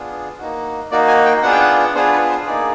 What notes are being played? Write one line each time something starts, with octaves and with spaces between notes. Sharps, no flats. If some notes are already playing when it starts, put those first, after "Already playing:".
Already playing: B3 D4 F4 G#4
A#3 D#4 F#4
A#3 D#4 F#4 D5
G#5
G5
B3 D4 F4 G#4 F#5
G5
F#5
B3 D4 F4 G#4 C5
B4
C5
A#3 D#4 G#4 D5